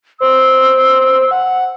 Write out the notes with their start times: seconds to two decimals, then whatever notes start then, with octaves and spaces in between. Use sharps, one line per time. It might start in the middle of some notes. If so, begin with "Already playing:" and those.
0.20 C5 E6
1.31 F#5